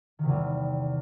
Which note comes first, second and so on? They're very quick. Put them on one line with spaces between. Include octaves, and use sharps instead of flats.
D#3 C3 E2 G3